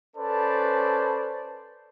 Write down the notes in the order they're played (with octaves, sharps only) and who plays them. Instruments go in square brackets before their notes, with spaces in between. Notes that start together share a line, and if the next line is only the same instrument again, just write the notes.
[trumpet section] C#4 A4 B4 C5 D5 A5